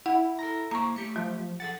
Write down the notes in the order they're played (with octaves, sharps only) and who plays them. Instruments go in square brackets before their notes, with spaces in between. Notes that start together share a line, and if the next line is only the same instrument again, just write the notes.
[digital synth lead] E4 [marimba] F#5
[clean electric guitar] A4 A#5
[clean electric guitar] A#3 E4 C5 [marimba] A#5 C#6
[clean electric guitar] A3 G4 [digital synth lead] C#7
[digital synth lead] F3 [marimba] F#3
[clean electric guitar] G#4 A4 F#5 [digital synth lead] A6